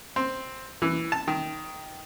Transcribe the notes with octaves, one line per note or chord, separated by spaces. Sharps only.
C4
E3
A5
D#3